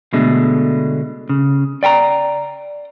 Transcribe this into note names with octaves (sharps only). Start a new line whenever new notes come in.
B2 D3 G#3 A3
C#3
D5 G5 G#5 A#5